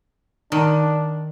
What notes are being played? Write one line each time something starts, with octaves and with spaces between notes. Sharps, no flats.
D#3 D4